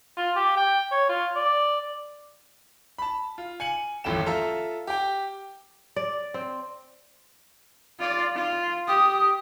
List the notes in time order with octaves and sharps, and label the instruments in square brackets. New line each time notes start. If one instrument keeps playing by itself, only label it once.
[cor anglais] F4
G4
G5
C#5
F4
D5
[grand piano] A5 B5
F4
G#5 C#7 F#7
D#1 A1 F2 A3 G5 E7
F4 A4 E5 A#5
G4 G5
[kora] D5
C4
[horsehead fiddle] F4 D5
F4
[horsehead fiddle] G4 [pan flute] D#6